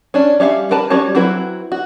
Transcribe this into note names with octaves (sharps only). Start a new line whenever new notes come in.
C#4 D4
G3 C#4 E5 F5
A#4 B4 A5 B5
G3 C#4 F#4 C#5 A5
F#3 C4 E4 F#4 B4
F#4